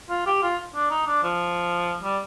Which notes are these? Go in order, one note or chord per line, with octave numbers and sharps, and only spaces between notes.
F4
G4
F4
D4
D#4
D4
F3
G3